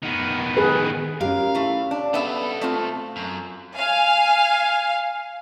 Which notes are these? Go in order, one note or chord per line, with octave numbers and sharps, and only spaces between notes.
D#3 B3
G#4 B4
C#4 F4 G4 A#4 F5
A3 E4
D4
B2 B3 A4 E5
A3 C4 F4
F#2
F5 G#5